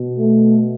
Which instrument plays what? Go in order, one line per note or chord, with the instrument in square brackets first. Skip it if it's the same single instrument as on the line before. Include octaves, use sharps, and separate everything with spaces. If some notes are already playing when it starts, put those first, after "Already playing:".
Already playing: [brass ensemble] B2
A3